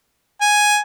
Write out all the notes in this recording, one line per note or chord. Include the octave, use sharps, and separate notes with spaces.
G#5